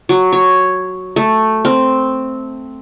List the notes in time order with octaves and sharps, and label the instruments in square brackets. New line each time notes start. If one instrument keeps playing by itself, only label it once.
[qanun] F#3
C#5
A3
C4